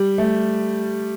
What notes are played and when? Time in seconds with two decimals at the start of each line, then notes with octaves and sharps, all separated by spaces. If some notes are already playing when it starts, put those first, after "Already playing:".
Already playing: G3
0.18 A3